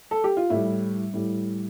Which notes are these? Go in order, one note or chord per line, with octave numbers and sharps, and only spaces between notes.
A4
G4
F4
A2 G3 E4
A2 G3